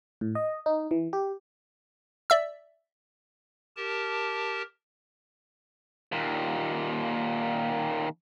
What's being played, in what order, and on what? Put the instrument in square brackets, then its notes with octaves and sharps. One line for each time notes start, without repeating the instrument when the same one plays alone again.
[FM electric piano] A2
D#5
D#4
E3
G4
[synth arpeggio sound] D5 E5 E6
[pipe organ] G4 A#4 A5
[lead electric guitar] D#2 A#2